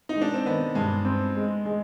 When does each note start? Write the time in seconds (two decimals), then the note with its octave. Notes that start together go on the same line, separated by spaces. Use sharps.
0.09 D#4
0.16 G#3
0.21 D4
0.34 C4
0.46 D#3 B3
0.75 G2 G#3
1.05 C4
1.36 G#3
1.66 G#3